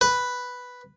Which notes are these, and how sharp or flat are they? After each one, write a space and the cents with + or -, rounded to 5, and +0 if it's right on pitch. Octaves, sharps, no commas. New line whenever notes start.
B4 +0